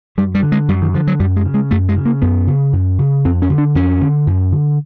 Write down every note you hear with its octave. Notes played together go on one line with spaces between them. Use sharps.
F#2 G3
G3
D3
G#3
F#2 G3
D#3
D3 F3
F#3
F#2 G3
G#3
C#3
G#3
F#2 A3
G#3
C#3
A#3
F#2 B3
C#3
F#2
C#3
F2 C4
C#4
D3
D4
F2 C#4
D3
F#2
D3